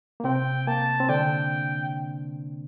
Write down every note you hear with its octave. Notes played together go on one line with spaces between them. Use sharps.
A#3
C3 C4 G5
A#3 A5
C4
D3 D4 G5